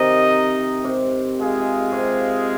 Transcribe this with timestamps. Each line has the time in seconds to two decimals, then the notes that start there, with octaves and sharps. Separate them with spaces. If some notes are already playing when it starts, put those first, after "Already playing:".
Already playing: C3 D#3 D#4 A#4 D#5
0.84 C3
1.38 G#3 F4 G#4 F5
1.92 C3